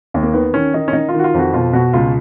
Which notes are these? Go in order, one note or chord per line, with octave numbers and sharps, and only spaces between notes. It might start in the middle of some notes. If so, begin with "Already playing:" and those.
D#2
A#3
D#3 B3
D#3 C#4
D#3 D#4
C#4
D#3 D#4
F4
D#3 F#4
F4
F2 F#4
B2 F4
B2 F#4
C#2 F4